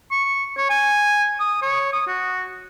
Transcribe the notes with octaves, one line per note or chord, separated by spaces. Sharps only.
C#6
C#5
G#5
D#6
C#5
D#6
F#4